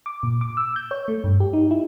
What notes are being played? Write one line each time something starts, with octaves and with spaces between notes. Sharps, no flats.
D6
A#2
D6
E6
G6
C#5
A3
G2
G4
D#4
E4